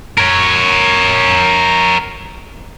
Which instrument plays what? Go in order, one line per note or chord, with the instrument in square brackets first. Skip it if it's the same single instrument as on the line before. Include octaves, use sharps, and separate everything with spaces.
[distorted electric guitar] A#4 C#5